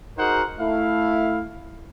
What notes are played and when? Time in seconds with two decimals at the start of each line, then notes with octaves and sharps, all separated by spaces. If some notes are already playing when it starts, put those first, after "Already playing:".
0.18 D#4 F#4 G#4 A#4 C5 F#5
0.60 A3 E4 F5